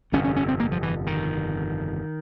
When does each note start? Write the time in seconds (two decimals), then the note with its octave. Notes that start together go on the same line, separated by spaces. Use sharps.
0.12 G1 F2 C3 C#4
0.24 C#4
0.36 C#4
0.48 C4
0.60 A#3
0.72 F3
0.83 E3
1.07 D#3